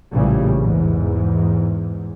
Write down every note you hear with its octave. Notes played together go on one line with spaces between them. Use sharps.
A#1 A2 C#3 E3 G3
E2 G#2